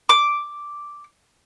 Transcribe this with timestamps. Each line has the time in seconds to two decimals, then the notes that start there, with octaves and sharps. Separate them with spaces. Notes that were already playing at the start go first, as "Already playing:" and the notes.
0.09 D6